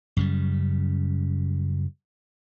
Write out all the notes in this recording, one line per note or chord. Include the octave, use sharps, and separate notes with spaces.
F#2 C#3 G3